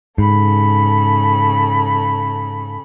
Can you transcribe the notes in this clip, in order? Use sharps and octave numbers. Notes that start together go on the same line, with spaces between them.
G#2 C#3 A4 B5